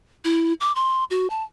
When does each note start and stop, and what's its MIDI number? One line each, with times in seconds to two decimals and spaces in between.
0.25 0.53 64
0.60 0.74 86
0.75 1.04 84
1.11 1.28 66
1.30 1.43 81